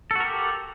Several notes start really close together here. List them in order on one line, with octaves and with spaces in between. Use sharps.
A4 F#4 A#4 G4